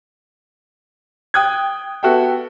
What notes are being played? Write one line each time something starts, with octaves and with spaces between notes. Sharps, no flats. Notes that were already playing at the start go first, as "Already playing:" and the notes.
G5 D#6 F#6 G#6
B3 F#4 A4 E5 G5